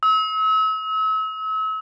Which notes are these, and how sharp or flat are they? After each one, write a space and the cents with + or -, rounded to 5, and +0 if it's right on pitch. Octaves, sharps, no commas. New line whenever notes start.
E6 -40